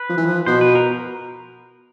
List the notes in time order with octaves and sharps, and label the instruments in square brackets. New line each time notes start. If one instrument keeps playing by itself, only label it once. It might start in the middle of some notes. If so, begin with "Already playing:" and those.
Already playing: [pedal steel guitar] B4
[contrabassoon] F3
E3
F3
[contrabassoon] B2 [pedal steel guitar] C5
[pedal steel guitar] B4
A#4